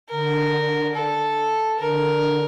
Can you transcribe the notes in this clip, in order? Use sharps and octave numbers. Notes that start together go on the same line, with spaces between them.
D3 A#4
A4
D3 A#4